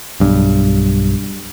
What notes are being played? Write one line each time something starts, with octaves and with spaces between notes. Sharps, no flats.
B1 G2